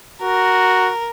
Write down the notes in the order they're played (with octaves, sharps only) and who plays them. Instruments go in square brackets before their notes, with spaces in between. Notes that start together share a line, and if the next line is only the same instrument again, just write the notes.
[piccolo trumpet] F#4 [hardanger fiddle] A#4